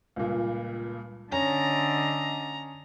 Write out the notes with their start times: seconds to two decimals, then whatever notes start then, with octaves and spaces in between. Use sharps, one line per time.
0.16 C#2 G2 A#2
1.32 D3 C#4 D#5 A#5